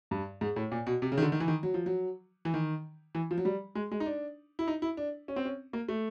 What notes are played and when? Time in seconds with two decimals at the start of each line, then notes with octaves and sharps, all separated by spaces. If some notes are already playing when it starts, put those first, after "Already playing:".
0.11 G2
0.41 G#2
0.56 A2
0.72 A#2
0.87 B2
1.02 C3
1.12 C#3
1.17 D#3
1.22 D3
1.32 D#3
1.40 E3
1.48 D#3
1.63 F#3
1.74 F3
1.86 F#3
2.45 E3
2.54 D#3
3.15 E3
3.31 F3
3.38 F#3
3.45 G3
3.75 G#3
3.91 G#3
4.00 D#4
4.06 D4
4.59 E4
4.68 D#4
4.82 E4
4.97 D4
5.28 C#4
5.36 C4
5.45 C#4
5.73 A#3
5.89 A3